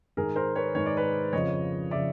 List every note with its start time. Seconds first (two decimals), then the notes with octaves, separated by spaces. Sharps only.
0.17 G#2 D#3 G#4 A#4
0.36 A#4 C5
0.56 B4 C#5
0.75 G#2 D#3 C#5
0.86 D5
0.97 B4 C#5
1.33 F2 C#3 F3 C#5 D#5
1.91 C#3 F3 D5 E5